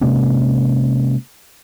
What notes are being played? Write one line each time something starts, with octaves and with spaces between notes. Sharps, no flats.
C3 G#3 A#3 C#4